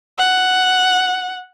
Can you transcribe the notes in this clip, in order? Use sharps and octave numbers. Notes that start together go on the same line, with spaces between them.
F#5